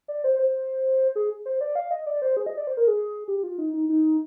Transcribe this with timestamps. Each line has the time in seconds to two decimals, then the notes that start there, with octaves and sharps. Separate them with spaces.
0.08 D5
0.24 C5
0.39 C5
1.16 G#4
1.46 C5
1.61 D5
1.75 F5
1.91 D#5
2.06 D5
2.22 C5
2.37 G#4
2.46 D#5
2.57 D5
2.67 C5
2.77 A#4
2.87 G#4
3.28 G4
3.43 F4
3.58 D#4
3.74 D#4
3.89 D#4